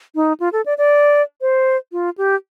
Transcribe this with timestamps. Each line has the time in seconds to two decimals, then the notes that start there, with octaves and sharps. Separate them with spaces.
0.15 D#4
0.40 F4
0.53 A4
0.66 D5
0.78 D5
1.41 C5
1.92 F4
2.18 G4